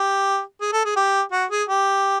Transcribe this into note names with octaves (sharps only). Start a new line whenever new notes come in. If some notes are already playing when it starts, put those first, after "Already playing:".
Already playing: G4
G#4
A4
G#4
G4
F#4
G#4
G4